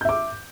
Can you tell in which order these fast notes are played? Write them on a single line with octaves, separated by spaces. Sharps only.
G6 E5 D6